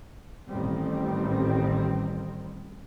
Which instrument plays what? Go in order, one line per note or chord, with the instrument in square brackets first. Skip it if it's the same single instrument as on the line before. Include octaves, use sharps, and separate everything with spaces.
[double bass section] A1 A2 D#3 G3 C4